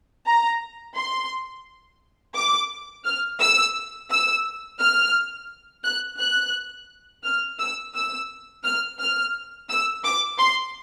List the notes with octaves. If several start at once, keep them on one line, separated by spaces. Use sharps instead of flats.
A#5
C6
D6
F6
E6
E6
F6
F#6
F#6
F6
E6
E6
F6
F6
E6
D6
C6